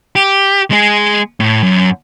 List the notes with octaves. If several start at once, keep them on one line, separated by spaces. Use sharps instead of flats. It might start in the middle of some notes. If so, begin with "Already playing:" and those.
G4
G#3 G#4
A2
F#2